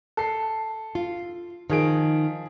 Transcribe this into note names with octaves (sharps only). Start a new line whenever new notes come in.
A4 C7
F4
D#3 F3 G#4 D7